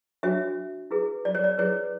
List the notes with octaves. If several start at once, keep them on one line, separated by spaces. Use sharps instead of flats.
D4 F#4 C#5 E5
E4 G#4 B4
D5
C#5
D5
E4 G#4 B4 C#5